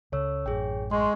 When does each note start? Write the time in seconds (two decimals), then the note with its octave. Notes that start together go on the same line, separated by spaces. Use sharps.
0.12 C#2 C#3 A4 C#5 E6
0.46 A1 F#2 G#4 C#5 G5
0.91 G#3 C6 C#6